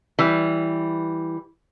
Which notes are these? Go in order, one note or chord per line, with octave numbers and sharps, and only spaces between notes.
E3 G3